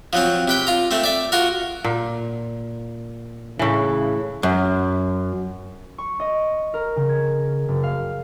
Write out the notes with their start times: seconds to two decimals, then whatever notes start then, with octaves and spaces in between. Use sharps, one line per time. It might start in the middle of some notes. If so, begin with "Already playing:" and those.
0.13 F3 F#3 C4
0.48 C3 B4 G5
0.67 F4 A#5
0.91 A3 C4
1.04 D5 E5
1.32 F4 F#4 A#4
1.84 A#2
3.59 A2 C#3 E3
4.43 F#2
5.98 C#6
6.20 D#5
6.74 A#4
6.96 C#3
7.09 G#6
7.68 F#1
7.83 F5